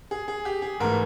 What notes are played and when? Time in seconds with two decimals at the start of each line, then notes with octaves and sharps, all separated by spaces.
0.11 G#4
0.28 G#4
0.45 G4
0.62 G#4
0.80 G#2 E3 A3 A#4